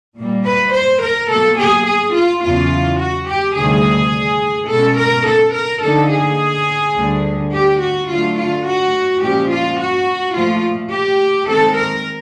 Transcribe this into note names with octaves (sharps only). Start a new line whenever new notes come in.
A#2 G3 A#3
B4
C5
A#4
B2 F#3 A#3 A4
G#4
G#4
F4
E2 C#3 F#3 F4
F#4
G4
D2 C3 D#3 G3 G#4
B2 G#3 C#4 A4
A#4
A4
A#4
D3 F3 A#3 D#4 A4
G#4
D2 D3 G3
G4
F#4
D3 F#3 A3 F4
F4
F#4
A#2 F3 G#3 C#4 G4
F4
F#4
A#2 F3 A3 F4
G4
D#3 G#3 C4 A4
A#4